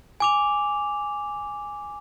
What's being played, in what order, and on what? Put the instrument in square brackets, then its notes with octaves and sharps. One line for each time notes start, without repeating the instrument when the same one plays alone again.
[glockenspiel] G#5 D6 F7